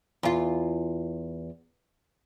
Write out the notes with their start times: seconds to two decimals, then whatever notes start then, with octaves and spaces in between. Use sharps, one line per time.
0.23 E2 F4